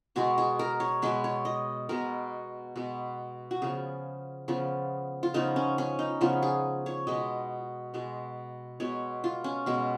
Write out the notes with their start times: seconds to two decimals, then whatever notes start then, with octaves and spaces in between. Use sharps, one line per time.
0.16 B2 G#3 B3 F#4
0.38 G#4
0.59 A#4
0.80 C#5
1.02 B2 G#3 B3 B4
1.24 C#5
1.45 D#5
1.89 B2 G#3 B3 A#4
2.76 B2 G#3 B3
3.51 F#4
3.62 C#3 F3 B3 G#4
4.48 C#3 F3 B3
5.23 F4
5.34 C#3 F3 B3 D#4
5.56 C#4
5.78 C#4
5.99 D#4
6.21 C#3 F3 B3 F4
6.42 G#4
6.86 C#5
7.07 B2 G#3 B3 D#5
7.94 B2 G#3 B3
8.80 B2 G#3 B3 C#5
9.24 F4
9.44 C#4
9.66 B2 G#3 B3